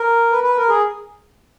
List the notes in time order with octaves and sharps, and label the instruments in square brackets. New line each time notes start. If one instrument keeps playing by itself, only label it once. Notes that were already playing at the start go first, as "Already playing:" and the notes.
Already playing: [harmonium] A#4
B4
B4
A#4
G#4